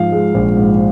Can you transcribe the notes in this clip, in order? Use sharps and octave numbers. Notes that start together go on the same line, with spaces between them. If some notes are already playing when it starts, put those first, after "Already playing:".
Already playing: G#2 F3 F5
G#3
A#1
G#2